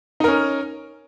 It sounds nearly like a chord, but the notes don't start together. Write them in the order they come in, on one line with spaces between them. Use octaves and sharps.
D#4 A#4 C#4